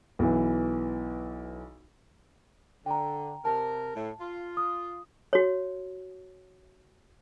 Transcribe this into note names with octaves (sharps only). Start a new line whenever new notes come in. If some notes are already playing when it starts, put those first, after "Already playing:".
B1 E3
D3 G5 A#5
C3 A#4 A5
A2
F4
D#6
F#4 C#5